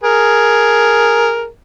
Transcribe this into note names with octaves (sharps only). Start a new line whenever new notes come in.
G#4 A#4